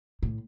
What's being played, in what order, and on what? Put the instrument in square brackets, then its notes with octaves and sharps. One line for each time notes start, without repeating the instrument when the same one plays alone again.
[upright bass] A2